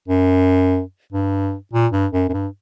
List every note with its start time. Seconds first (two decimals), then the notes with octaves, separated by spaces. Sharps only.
0.08 F#2
1.13 G2
1.73 A#2
1.93 G2
2.13 F#2
2.29 F#2
2.33 G2